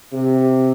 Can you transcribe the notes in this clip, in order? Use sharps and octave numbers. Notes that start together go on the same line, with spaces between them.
C3